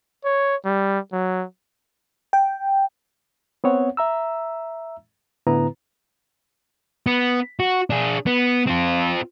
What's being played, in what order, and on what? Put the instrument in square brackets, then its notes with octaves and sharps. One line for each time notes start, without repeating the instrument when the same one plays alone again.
[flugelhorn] C#5
G3
F#3
[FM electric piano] G5
[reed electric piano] B3 C4 C#5 F#5
E5 A#5 E6
A2 D3 B3 E4 B4 A#5
[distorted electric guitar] B3
F#4
D4 G#4
B3
C4 F4